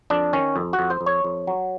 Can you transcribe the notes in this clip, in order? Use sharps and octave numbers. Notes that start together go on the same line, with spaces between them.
F2 D4
D#3 C#4
F2
F#4
F2
C5
F2
C#5
F2
F#3